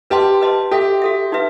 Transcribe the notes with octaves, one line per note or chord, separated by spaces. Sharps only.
G4 B4 D#5 A5 C6
B4 D#5 A5 C6
F#4 G4 A4 E5
F#4 A4 E5
D#4 F#4 B4 E5